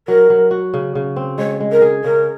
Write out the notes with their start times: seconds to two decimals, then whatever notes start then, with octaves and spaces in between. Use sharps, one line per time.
0.08 F#3 A#4
0.30 F#3
0.51 F#4
0.74 C#3
0.95 C#3
1.16 C4
1.38 G#3 C#5
1.60 G#3
1.71 A#4
1.82 G#4
2.04 C#3 A#4